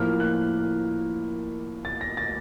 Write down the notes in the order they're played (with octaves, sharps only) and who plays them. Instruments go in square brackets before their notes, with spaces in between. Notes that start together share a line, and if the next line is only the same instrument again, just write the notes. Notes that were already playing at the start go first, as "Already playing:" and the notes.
Already playing: [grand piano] A2 F3 A#3 F6
F#6
A6
A#6
A6